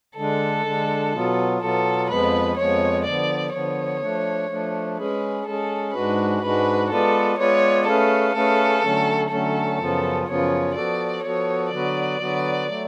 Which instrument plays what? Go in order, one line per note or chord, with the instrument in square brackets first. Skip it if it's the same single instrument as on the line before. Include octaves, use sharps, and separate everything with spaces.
[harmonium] D3 G#3 D4 [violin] A4
[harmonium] D3 G#3 D4
B2 F#3 B3 F4
[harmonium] B2 F#3 B3 F4 [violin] A4
[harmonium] F2 F3 G#3 B3 [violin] B4
[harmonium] F2 F3 G#3 B3 [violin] C#5
[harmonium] D3 F3 B3 [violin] D5
[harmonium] D3 F3 B3 [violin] C#5
[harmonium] F3 A3 D4
F3 A3 D4
[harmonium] G#3 C#4 G#4 [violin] B4
[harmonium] G#3 C#4 G#4 [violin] A4
[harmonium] G#2 G#3 D4 F#4 [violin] B4
[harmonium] G#2 G#3 D4 F#4 [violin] B4
[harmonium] G#3 B3 F4 B4 D5 [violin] A4
[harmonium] G#3 B3 F4 B4 D5 [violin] C#5
[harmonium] A3 C#4 G#4 B4 F5 [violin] A4
[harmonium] A3 C#4 G#4 B4 F5 [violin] A4
[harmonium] D3 F#3 A3 C#4
[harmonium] D3 F#3 A3 C#4 [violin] A4
[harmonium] F#2 C#3 F3 B3 F4
[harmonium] F#2 C#3 F3 B3 F4 [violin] C#5
[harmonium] F3 B3 F#4 A4 [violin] D5
[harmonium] F3 B3 F#4 A4 [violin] C#5
[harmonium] D3 F#3 B3 F#4 B4 [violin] D5
[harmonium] D3 F#3 B3 F#4 B4
F#3 A3